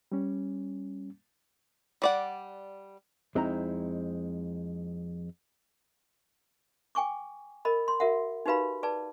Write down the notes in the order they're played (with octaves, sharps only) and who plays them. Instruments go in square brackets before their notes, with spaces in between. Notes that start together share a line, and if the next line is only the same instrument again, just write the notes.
[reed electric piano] G3 C#4
[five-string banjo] G3 D5 F#5
[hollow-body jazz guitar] F2 G#3 C4 D#4 E4 A#5
[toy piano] G5 G#5 C#6 D6
A#4 D#5 B5
C6
F#4 A#4 E5 F#5
D#4 F#4 G4 B4 F5 B5
G#4 B4 D5 A5